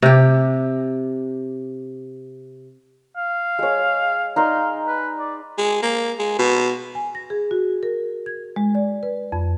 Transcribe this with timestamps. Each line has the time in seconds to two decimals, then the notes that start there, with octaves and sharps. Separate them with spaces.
0.02 C3 G4
3.17 F5
3.59 G#3 C#5
4.36 D#4 D5 F5 C6
4.88 B4
5.19 D5
5.58 G#3
5.83 A#3
6.19 G#3
6.39 B2
6.95 G#5
7.15 A#6
7.30 G#4
7.51 F#4
7.83 A#4
8.26 G#6
8.56 G#3
8.75 D5
9.03 B4
9.32 F2